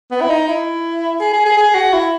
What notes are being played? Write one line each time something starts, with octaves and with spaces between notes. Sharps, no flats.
B3
E4
D#4
E4
G#4
G#4
G#4
G#4
F#4
E4